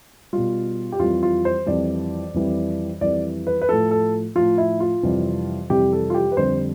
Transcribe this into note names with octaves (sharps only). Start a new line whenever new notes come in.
B2 G3 F4
G4
F2 E3 G3 F4
F4
C5
F2 E3 G3 D5
F2 E3 G3
F2 E3 G3 D5
B4
B4
A2 F3 A4
A4
A2 F3 F4
E4
F4
F2 C3 E3 G3
F2 C3 E3 G3 G4
A4
F4
G4
B4
F2 D3 G3 C5